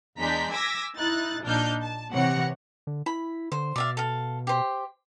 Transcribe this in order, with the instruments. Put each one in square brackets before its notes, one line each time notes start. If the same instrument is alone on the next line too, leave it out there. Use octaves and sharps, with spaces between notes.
[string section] E2 G#3 D4 A#5 G6 B6
G#5 D6 E6 G#6 A#6 B6
D#4 E4 F#6 A6
A#1 A#2 D4 D#4 F6 G6
A5
C3 E3 C#5 F#5 A#6 C#7
[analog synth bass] D3
[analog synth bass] E4 [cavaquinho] B5
[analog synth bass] D3 [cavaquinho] C5
[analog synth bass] B2 [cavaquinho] D5 E5 F5
[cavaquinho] A4 F5
G4 C5